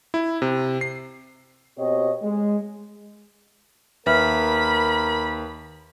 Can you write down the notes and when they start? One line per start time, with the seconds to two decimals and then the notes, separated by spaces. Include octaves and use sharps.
0.14 E4
0.42 C3
0.81 C7
1.78 B2 C4 G4 C#5 D#5
2.23 G#3
4.06 D#2 A#4 B4 E5 B5 F6